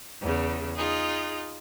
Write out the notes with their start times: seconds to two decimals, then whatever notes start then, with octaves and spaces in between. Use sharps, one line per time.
0.21 E2 C#3
0.77 D#4 F4 G#4